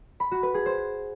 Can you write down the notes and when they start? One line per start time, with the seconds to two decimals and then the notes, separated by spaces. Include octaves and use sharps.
0.20 B5
0.31 F#4
0.43 B4
0.54 G#4
0.66 C5